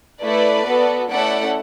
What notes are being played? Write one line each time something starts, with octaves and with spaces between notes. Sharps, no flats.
A3 E4 A4 B4 D5
B3 F#4 A4
A3 C#4 E4 A4 D5 F#5